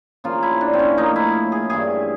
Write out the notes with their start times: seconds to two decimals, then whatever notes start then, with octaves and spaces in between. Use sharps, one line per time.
0.24 C#3 F3 A#3 F4
0.43 E4
0.61 D4
0.73 C4
0.79 C#4
0.97 A2 F3 A#3 D#4
1.16 E4
1.52 G#4
1.70 G2 E3 A3 G#4